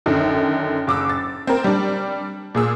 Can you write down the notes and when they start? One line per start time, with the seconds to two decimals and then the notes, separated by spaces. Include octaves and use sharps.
0.06 F#2 D3 D#3
0.87 F#1 D6 E6
1.10 A6
1.47 C4 A#4
1.64 G3 D4
2.55 A#2 G#4 E6